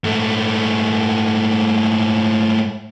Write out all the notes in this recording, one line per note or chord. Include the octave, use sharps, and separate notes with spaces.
G#2 A3